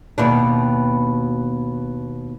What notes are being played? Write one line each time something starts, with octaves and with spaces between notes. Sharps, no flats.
D#2 B2 D4